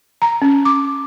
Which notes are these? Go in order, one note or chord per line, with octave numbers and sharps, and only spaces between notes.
A#5
C#4
D6